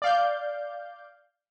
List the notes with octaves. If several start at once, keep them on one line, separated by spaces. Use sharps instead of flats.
D5 F5 G6